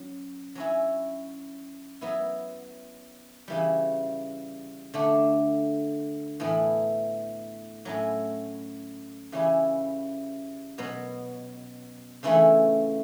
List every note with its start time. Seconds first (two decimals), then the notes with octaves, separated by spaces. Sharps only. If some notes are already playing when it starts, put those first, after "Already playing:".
Already playing: F#3 C#4
0.55 F#3 C#4 E4
2.01 F#3 B3 E4
3.48 C#3 E3 G3
4.94 D3 A3 D4
6.40 A2 E3 B3
7.85 A2 F#3 C#4 E4
9.32 C#3 E3 G3 C#4 E4
10.78 B2 F#3 B3
12.23 C#3 E3 A3 C#4 E4